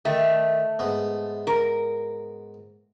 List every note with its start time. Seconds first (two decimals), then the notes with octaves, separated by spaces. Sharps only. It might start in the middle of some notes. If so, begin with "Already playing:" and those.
0.05 D#3 A3
0.79 G#2 B3
1.47 A#4